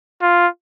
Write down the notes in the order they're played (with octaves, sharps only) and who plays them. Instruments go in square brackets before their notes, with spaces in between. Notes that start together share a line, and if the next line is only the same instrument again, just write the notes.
[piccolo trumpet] F4